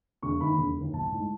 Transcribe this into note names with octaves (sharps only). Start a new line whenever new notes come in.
E1 C#6
D#2 D#3 B5
E1
D#2 D#3
B1 A5
A2 G#3 D#4